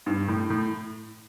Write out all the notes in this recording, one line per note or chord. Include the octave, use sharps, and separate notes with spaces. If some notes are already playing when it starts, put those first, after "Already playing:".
G2
A2
A2